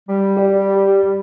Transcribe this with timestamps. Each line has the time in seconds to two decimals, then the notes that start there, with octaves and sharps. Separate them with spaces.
0.09 G3
0.37 G4 D5